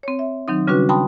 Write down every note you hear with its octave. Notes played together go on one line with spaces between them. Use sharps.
C4 C#5
E5
D#3 F#3 C4 D#4
C#3 G3 C#4 D4 F#4 B4
G5 A5 B5 C6 D#6